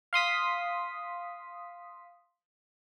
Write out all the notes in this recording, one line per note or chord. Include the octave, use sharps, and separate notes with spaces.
F5 C6 D#6 B6